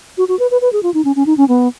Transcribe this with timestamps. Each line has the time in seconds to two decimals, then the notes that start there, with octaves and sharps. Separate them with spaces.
0.18 F#4
0.28 F#4
0.39 B4
0.51 B4
0.62 B4
0.73 G#4
0.83 F4
0.94 D#4
1.05 C#4
1.16 C#4
1.26 D#4
1.37 C#4
1.48 B3